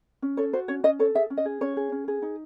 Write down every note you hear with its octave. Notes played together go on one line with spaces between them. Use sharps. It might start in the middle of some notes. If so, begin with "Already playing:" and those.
C#4
A4 C#5
F#4 C5
C#4 C#5
C#4 D#5
A4 C#5
G#4 E5
C#4
D#5
G#4
C#4 C#5
G#4
C#4
G#4
D#4